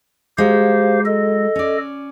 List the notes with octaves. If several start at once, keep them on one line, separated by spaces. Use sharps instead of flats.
F#3 G#3 G4 C5 F5
A4 D#5
C#4 D5